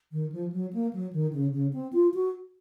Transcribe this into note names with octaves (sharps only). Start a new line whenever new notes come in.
D#3
F3
F#3
A#3
F#3
D#3
C#3
C#3
C4
F4
F#4